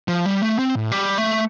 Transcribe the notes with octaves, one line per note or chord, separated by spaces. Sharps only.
F3
G3
A3
C4
A2
G3
A3